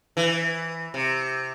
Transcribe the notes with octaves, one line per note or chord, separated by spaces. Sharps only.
E3
C3